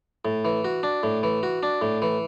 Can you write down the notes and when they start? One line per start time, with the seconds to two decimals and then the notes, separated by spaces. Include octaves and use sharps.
0.25 A2
0.45 E3
0.64 F#4
0.83 D4
1.03 A2
1.23 E3
1.43 F#4
1.63 D4
1.81 A2
2.02 E3